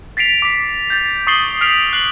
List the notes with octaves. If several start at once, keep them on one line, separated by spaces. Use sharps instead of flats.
A6 B6 C7 D7 F7
D6 B6
G6 A6
C#6 D#6 A6 C7 F#7 G7
F6 B6 C7 D7 F7
F#6 C7 F#7